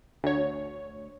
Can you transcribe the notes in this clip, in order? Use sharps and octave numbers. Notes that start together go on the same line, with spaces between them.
D2 C#5